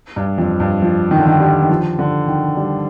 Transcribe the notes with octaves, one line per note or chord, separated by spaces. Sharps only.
G2
F2
G2
F3
D#3
D3
D#3
G3
D#3
F3
D3
D#3
G3